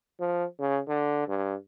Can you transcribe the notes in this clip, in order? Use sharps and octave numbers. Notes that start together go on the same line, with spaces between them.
F3
C#3
D3
G2